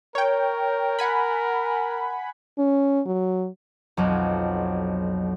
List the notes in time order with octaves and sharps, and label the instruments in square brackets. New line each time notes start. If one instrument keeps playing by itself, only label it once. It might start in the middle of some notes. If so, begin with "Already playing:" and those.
[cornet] A#4 [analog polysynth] C#5 G5
[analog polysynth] F#5 G#5 B5
[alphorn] C#4
F#3
[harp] B1 F2 F#3